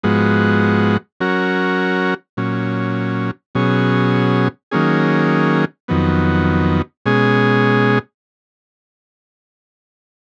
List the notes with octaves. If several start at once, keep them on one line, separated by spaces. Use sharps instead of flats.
G#2 F3 G#3 B3 F#4
F#3 C#4 F#4 A#4
A#2 F#3 C#4
B2 F#3 C#4 G#4
D#3 F#3 A#3 C#4 G#4
F2 D#3 F#3 B3
B2 G#3 C#4 G#4